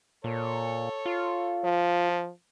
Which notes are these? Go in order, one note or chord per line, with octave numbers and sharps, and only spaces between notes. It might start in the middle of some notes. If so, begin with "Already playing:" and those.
A#2 A4 C#5
F4
F3